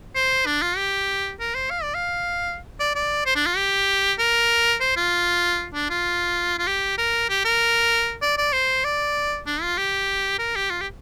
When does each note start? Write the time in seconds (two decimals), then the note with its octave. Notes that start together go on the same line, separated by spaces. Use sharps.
0.15 C5
0.46 D4
0.62 F4
0.77 G4
1.40 A#4
1.55 C5
1.71 F5
1.83 D5
1.95 F5
2.80 D5
2.95 D5
3.26 C5
3.35 D4
3.46 F4
3.57 G4
4.19 A#4
4.80 C5
4.96 F4
5.74 D4
5.90 F4
6.59 F4
6.67 G4
6.98 A#4
7.30 G4
7.45 A#4
8.22 D5
8.38 D5
8.53 C5
8.84 D5
9.46 D4
9.62 F4
9.78 G4
10.39 A#4
10.56 G4
10.70 F4
10.81 G4